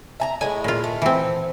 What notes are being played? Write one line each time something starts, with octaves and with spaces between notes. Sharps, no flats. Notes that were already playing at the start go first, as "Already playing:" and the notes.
E5 G#5 A#5
A2 G#3 E4 G#5
A#2 F4
A3
E3 C4